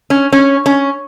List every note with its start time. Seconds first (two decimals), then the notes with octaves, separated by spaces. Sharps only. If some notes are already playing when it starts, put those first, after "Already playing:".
0.10 C#4
0.32 C#4
0.66 C#4